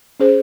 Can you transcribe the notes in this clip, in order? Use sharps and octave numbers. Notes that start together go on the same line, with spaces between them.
C#4 G#4 C5